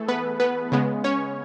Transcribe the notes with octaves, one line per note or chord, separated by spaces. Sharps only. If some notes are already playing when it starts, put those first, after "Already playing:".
Already playing: E3 A3 G#4 A4
B3 B4
B3 B4
C#3 G#3 B3
C#4 C#5